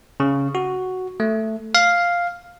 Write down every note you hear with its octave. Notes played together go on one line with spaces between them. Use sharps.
C#3
F#4
A3
F5